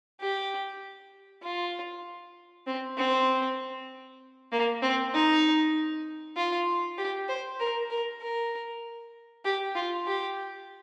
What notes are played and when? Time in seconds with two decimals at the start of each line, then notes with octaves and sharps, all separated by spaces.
0.21 G4
1.43 F4
2.67 C4
2.98 C4
4.52 A#3
4.82 C4
5.14 D#4
6.36 F4
6.98 G4
7.28 C5
7.60 A#4
7.90 A#4
8.21 A#4
9.45 G4
9.75 F4
10.06 G4